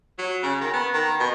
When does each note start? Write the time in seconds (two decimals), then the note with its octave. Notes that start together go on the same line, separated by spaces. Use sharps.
0.19 F#3
0.43 C#3
0.61 D#3
0.73 B3
0.94 D#3
1.20 B2